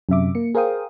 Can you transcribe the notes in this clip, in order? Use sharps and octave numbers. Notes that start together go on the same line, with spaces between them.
F#2 C3 E5 D6
A#3 C#7
G#4 A#4 C5 F5 G5 D#6